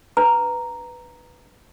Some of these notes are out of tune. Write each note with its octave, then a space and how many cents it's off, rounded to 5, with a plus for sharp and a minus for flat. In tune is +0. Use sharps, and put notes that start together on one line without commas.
D4 +0 B4 +0 A#5 +0